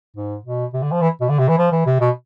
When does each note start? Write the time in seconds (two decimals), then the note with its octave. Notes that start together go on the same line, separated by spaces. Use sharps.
0.17 G#2
0.45 B2
0.73 C3
0.83 D3
0.92 F3
1.01 E3
1.21 B2
1.29 D3
1.39 C3
1.49 E3
1.58 F3
1.72 E3
1.86 C3
2.00 B2